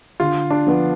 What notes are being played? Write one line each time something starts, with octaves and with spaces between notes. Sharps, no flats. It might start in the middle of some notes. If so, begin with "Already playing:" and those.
D3 F4
D4
F3 B3